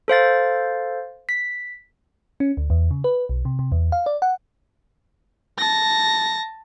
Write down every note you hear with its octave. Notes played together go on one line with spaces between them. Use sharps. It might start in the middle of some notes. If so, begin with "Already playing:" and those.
A4 C5 F5 A6
B6
C#4
D2
E2
C#3
B4
B1
C3
C3
E2
F5
D5
F#5
A5 A#6